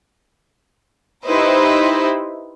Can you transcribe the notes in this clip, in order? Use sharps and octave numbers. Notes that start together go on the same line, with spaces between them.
D#4 E4 G4 B4 C5